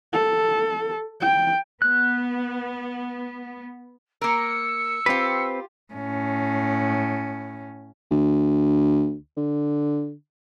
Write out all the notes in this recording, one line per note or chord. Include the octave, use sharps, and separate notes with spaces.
A4
G5
B3 F#6
A#3 A#4 E6 C#7
C4 F4 G4 B4
A2 C#4
D2
D3